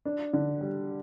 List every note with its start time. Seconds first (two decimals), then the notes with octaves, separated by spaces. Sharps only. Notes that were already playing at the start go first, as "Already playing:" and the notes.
0.05 D4
0.33 D3
0.61 G3